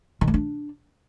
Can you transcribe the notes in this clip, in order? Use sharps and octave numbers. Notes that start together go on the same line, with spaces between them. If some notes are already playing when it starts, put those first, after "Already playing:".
D#3
A3
D4